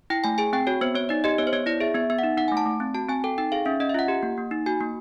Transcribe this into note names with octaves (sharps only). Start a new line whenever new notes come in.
E4 G5
A3 G#5
G#4 G#5
C4 G5
F#4 C#5
B3 C5
B3 C#5
D#4 D5
G4 D#5
B3 C#5
C5
B3 C#5
E4 D5
G#4 E5
B3 E5
B3 E5
F#5
D#4
D#4 F#5
G#5
A3
A5
A3
C4
F#4 A5
C4 G#5
A4 G5
D#4 G5
G#4 F5
C#4 E5
C#4 D#5
E5
F4 F#5
G4
A#3
A#3
D#4
F#4 G#5
A#3